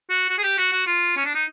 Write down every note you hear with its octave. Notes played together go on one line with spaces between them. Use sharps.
F#4
F#4
G#4
G4
F#4
F#4
F4
C#4
D4
D#4